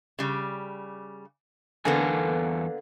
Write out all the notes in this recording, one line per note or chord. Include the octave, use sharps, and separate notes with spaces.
C#3 G3
E2 D3 A#3 B3 A4 G#5